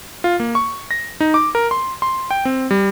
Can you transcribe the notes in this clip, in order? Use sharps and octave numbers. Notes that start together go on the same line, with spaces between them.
F4
A#3
C#6
A#6
D#4
D6
A#4
C6
C6
G5
C4
G3